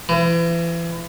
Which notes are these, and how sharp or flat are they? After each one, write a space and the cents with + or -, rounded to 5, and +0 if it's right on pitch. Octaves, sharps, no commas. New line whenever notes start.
E3 +35